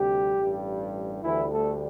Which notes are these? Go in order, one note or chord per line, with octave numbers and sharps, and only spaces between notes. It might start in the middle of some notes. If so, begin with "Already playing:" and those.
Already playing: D2 C3 G3 G4
A1 G2 G3
D2 D3 E3 G3 E4
A3 A4